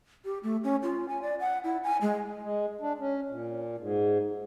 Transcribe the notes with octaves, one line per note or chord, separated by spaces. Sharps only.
G4
A3
C#4
F4
G#5
D5
F#5
E4
G#5
G#3
G#3
D4
C#4
A#2
G#2